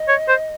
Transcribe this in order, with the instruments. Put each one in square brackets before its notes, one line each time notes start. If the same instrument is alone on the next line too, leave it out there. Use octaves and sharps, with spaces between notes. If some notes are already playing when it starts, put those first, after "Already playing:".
Already playing: [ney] D#5
[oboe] C#5
C5